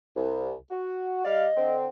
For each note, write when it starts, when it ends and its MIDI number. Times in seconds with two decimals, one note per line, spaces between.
0.15 0.52 36
0.71 1.24 66
1.25 1.46 55
1.25 1.46 74
1.25 1.74 75
1.25 1.46 77
1.56 1.87 50
1.56 1.87 60